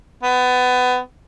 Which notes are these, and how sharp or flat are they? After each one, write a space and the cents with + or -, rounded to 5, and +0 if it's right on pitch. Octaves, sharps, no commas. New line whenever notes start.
B3 +25